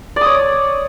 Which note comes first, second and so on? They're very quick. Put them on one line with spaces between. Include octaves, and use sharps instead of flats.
D5 D#6 C#5